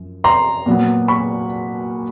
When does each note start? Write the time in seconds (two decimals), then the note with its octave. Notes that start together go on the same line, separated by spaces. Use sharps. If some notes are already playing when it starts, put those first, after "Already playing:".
Already playing: F#2 F3
0.24 A#5 C6
0.66 A#2 F#3 B3
1.08 B5 C#6